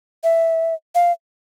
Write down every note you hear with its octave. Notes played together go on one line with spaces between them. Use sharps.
E5
F5